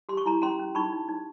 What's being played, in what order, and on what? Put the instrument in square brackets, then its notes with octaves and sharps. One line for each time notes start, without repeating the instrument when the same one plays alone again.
[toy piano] G4 C6
C#6
E4 A#5 C6
C#4 A#5 C6
C#4
D#4 B5 C#6
D#4
D#4